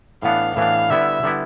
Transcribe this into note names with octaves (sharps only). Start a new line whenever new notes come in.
A2 E3 B3 D4 F5
A2 E3 B3 D4 F5
D3 G3 B3 E4 E5
D3 G3 B3 E4